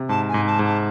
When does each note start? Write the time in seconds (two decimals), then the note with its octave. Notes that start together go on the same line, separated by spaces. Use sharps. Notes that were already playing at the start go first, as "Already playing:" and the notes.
Already playing: C3
0.09 G#2 A5
0.29 G#5
0.34 G#2
0.47 A5
0.59 G#2
0.65 A5